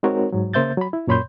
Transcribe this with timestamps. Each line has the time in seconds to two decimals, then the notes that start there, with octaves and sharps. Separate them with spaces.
0.03 G#3 C4 D#4 F#4 A#4 C#5
0.32 G#2 F#3
0.54 C#3 A#3 C5 E5 G6 A6
0.77 F#3 B5
0.93 E4
1.07 F#2 A#2 C#5 B5 C6 G6